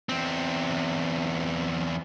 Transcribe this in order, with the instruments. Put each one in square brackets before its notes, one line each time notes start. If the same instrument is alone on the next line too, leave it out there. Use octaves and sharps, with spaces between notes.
[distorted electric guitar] E2 C4